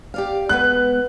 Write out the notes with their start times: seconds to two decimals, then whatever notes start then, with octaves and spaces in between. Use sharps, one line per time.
0.14 G4 D5 F5
0.49 G#3 B3 B4 F#6